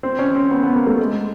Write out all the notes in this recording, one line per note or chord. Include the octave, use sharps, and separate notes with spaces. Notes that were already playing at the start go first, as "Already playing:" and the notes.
C4
C#4
C4
B3
B3
A#3
A3
G#3